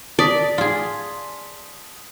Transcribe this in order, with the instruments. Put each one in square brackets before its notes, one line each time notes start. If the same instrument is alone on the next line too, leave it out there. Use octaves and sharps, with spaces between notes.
[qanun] D5 [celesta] A5 D#6 B6
[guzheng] F4 G#4